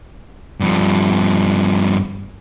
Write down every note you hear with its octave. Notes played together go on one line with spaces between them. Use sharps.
G2 F3